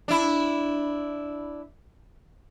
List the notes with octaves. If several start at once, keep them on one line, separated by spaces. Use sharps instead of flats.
D4 E4